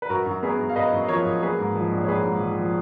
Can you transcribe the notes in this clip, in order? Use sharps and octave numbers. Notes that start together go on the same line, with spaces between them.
B4
F#2 F#4 A#4
F#2
B3 G#4 B4
F#2
F5
F#2 B4 D#5
F#2
F3 A#4 C#5
F#2
A#3 G#4 B4
G#2
F3
A#1
C#5
A#1 G#4 B4
G#2
F3
F3